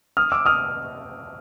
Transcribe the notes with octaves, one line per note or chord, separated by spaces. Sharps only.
D#6 F6
D6 E6
D#6 F6